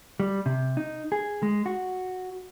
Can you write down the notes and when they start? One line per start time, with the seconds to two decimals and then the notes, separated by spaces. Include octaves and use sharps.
0.20 G3
0.46 C3
0.77 D#4
1.12 G#4
1.43 G#3
1.66 F#4